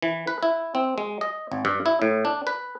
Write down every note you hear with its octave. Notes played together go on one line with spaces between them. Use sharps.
E3
B4
E4
C4
G#3
D#5
G#1
G2
E4
A2
D4
B4